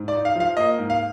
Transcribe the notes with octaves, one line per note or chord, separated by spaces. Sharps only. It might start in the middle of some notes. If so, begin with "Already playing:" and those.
Already playing: G#2
D5
D#4
F5
F3 F5
A#3 D#5
G#2
F5